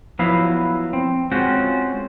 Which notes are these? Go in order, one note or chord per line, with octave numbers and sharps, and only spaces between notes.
F3 F#3 B3 E4 F5
C4
G#3 C4 C#4 F4 F#4